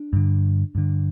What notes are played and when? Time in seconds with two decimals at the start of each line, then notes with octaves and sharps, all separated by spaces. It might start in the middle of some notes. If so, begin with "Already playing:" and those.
Already playing: D4
0.13 G2 D3
0.75 G2 D3